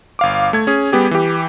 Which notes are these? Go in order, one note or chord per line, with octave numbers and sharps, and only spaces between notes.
G1 F5 D6
A3 G#6
C#4 G#4
G3 B3 G4 G#4
E3 G4